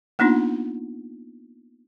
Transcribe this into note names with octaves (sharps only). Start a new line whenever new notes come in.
A#3 B3 D4 D#4 F4